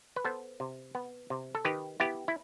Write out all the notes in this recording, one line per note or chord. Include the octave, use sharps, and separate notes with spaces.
B4
B3 A4 C5
C3
B3
C3
A4
D#3 G4 B4
B3 E4 G4
E4